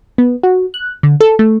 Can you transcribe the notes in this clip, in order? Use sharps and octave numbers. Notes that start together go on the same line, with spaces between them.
B3
F#4
F#6
D3
A4
A3